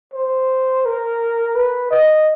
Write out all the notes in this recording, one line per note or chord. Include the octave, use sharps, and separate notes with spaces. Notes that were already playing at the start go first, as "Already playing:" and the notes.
C5
A#4
B4
D#5